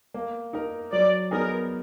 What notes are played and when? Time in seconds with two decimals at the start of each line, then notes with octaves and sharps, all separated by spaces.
0.14 A#3
0.53 D#4 A#4
0.92 F#3 D5
1.31 B3 D#4 G#4 A#4